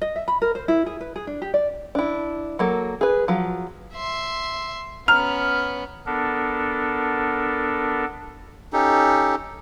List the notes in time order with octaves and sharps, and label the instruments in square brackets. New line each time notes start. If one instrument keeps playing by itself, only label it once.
[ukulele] D#5
E5
B5
A#4
C5
E4
G#4
B4
G#4
D4
G4
D5
[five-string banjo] D4 E4
F#3 A#3 A4
G#4 B4
F3 F#3
[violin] E5 C6
[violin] B3 C#4 [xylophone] A#5 [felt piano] F6
[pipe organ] B3 D4 A4 A#4
[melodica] C#4 D#4 G4 A4